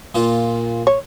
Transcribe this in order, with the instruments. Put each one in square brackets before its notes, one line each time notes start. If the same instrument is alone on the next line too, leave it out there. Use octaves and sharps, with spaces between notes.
[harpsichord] A#2 F4
[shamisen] C#5